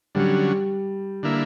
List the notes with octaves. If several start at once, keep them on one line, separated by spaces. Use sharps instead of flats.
D3 F#3 G3 C#4
D3 A#3 E4